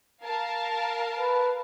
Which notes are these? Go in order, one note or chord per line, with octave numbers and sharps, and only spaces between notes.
A#4 F5 A5
B4